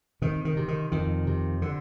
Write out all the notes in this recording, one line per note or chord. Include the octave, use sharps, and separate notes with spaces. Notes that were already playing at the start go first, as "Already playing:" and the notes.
C3 D#3
D#3
C3
D#3
F2 D#3
C3
D3